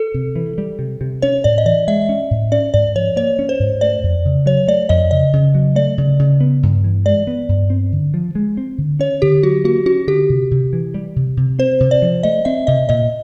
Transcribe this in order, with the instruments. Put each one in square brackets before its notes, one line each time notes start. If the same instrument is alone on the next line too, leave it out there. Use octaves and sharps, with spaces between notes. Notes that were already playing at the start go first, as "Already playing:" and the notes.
Already playing: [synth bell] A4
[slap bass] C3
E3
G3
C3
C3
[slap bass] C#4 [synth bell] C#5
[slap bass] A2 [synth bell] D5
[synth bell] D#5
[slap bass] E3 [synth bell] D5
[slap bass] G#3 [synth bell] E5
[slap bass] C#4
A2
[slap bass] C#4 [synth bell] D5
[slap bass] G#2 [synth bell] D5
[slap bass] F3 [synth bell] C#5
[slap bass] A#3 [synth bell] C#5
[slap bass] C#4
[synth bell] C5
[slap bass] G#2
[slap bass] A3 [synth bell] D5
[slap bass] F2
C#3
[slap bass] F#3 [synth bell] C#5
[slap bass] A3 [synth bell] D5
[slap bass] F2 [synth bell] D#5
[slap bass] C#3 [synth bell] D#5
[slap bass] C#3
F#3
[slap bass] A3 [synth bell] D5
[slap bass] C#3
C#3
B3
G2
E3
[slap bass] G#3 [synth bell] D5
[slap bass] B3
G2
C4
D3
F3
G#3
C4
D3
[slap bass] C#4 [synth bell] C#5
[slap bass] D3 [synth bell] G4
[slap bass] F#3 [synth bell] F#4
[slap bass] A#3 [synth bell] F#4
[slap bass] C#4 [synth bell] F#4
[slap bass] D3 [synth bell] G4
[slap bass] C3
C3
E3
G3
C3
C3
[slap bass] C4 [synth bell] C5
[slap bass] C3
[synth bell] D5
[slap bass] F3
[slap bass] A3 [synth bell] D#5
[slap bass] C4 [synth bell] E5
[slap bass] C3 [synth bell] D#5
[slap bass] A#2 [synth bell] D#5